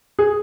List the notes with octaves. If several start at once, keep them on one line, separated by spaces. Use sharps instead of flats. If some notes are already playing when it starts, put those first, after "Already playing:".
G#4